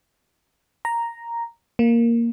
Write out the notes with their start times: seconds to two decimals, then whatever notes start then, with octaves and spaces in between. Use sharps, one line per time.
0.85 A#5
1.79 A#3